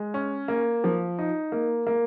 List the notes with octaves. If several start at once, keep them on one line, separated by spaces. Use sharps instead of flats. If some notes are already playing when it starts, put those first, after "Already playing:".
Already playing: G#3
C#4
A#3
F3
D#4
A#3
A#3